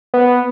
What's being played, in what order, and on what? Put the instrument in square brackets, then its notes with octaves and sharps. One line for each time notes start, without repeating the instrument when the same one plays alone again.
[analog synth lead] B3